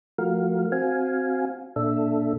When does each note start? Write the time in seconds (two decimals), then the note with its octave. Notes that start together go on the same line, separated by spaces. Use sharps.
0.18 F3 A3 F#4 A#4 F5
0.72 C4 F#4 F5 G#5
1.76 A#2 D4 A4 E5